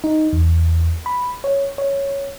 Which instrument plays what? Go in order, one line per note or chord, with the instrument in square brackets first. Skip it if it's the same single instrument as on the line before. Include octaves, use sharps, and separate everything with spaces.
[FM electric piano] D#4
E2
B5
C#5
C#5